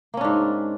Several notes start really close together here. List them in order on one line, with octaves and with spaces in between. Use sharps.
A#3 C#4 D4 G#2